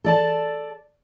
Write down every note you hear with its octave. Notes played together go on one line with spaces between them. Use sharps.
A4 D5 A5